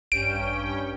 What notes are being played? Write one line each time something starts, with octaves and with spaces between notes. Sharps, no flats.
A1 G2 C#4 G5 D7